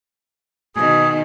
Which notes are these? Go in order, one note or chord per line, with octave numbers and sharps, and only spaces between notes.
B2 D#3 G#4